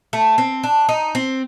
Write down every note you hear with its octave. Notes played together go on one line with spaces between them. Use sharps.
A3
C4
D4
D#4
C4